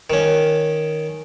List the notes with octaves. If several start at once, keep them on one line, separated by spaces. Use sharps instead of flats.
D#3 C#4